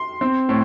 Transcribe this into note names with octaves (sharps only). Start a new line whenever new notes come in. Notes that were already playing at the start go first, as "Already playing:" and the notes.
Already playing: C6
C4
A2